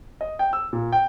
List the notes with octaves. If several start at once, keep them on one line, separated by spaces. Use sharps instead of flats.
D#5
G5
E6
A#2
G5